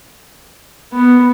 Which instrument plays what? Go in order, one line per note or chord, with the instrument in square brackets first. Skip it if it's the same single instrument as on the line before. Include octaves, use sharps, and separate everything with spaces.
[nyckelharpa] B3